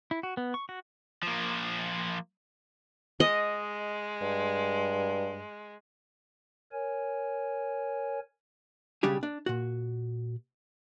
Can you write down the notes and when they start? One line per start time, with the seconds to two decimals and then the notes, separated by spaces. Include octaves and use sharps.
0.11 E4
0.23 F#4
0.37 B3
0.54 C#6
0.69 F#4
1.23 F3 A#3
3.20 G#3 D#5
4.21 G2
6.72 A#4 C#5 G#5
9.03 B1 C#3 G3 D4 G4 G#4
9.23 D4
9.46 A#2 F#4